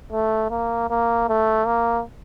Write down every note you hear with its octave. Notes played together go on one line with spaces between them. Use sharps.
A3
A#3
A#3
A3
A#3